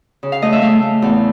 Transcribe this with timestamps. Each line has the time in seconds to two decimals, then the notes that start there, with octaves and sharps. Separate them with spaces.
0.23 C#3
0.32 F5
0.42 A3 D#5
0.52 E5
0.62 A3 F5
0.82 A3
1.02 E2